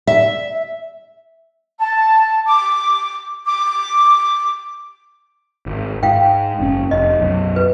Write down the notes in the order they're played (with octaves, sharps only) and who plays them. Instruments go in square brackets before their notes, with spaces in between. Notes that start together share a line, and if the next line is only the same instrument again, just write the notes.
[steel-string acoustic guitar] E5
[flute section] A5
D6
D6
[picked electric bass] G#1
[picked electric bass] G#2 [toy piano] F5 G5
[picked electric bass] F#1 C#4
[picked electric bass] F1 [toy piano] D#5
[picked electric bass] B1 F#2
[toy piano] B4